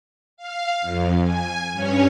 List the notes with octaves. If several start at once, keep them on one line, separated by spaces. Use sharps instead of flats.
F5
F2
G#5
G2 C#4 C#5